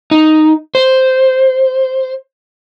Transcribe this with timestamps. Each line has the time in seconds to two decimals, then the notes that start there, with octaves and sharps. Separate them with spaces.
0.11 D#4
0.75 C5